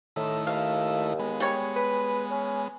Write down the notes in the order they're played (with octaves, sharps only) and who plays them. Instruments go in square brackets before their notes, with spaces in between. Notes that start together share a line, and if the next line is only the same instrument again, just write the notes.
[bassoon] A2 [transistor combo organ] D#3 A3 E4
[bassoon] D#2 [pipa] F5
[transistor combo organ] G#3 B3
[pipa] G3 C#5
[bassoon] B4
C#4